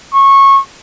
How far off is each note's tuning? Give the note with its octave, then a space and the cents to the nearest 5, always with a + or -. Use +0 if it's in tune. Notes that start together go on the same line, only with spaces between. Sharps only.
C#6 -20